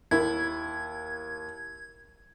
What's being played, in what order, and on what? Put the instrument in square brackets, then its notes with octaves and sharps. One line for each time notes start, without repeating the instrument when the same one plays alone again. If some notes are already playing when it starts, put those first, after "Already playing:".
[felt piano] D#2 [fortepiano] E4 [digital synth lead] G#6